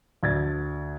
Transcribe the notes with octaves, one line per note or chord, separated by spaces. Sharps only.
D2 G#6 A6